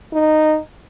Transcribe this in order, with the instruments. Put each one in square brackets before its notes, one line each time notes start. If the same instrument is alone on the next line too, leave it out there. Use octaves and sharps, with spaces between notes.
[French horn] D#4